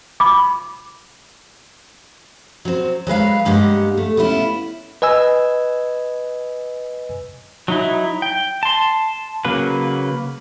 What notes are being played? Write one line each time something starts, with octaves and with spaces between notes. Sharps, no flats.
B5 D6
F#3 C4
F#3 G#3 B4 F5
G2 G#3 A#3 G4 F#5
A3
B3 C#4 D4 E4 F4
B4 D#5 G#5 E6
F#3 D#4 E4
G5
A5 C6
C#3 F#3 A#3 B4